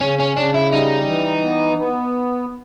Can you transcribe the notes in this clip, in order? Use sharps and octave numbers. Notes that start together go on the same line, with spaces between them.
C#3 C#4
C#4
C#3 D4
E4
G3 D#4
E3
B3
B3